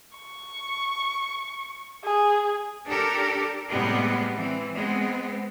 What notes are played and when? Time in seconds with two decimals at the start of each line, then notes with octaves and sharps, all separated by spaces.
0.18 C#6
2.04 G#4
2.86 D4 G4 A4 A#4
3.69 A2 C3 G3 G#3 B3
4.36 E3 C4
4.74 G#3 B3 C4